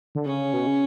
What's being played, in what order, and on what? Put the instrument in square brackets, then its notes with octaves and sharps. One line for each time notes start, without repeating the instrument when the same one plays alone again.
[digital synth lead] D3
[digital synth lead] C#3 [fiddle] C#4
[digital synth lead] B2
C#3